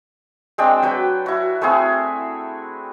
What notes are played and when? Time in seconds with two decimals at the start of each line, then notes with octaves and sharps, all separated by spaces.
0.58 G#3 C4 D4 G5
0.83 F#3 B4 G5
1.26 E4 F#4
1.61 A3 C4 E4 G#4